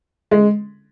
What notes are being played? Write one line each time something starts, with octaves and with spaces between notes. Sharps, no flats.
G#3